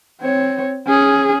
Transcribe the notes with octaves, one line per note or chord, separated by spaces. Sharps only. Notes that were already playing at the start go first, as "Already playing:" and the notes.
C4 C#5
C#4 G#4